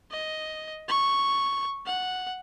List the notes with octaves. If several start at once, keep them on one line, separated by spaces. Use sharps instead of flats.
D#5
C#6
F#5